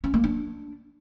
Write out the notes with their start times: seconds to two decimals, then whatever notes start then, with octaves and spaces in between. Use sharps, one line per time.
0.04 C#4
0.14 A#3
0.24 D4